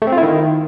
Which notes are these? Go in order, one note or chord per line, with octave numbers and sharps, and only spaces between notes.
A3
C4
F4
E4
D#3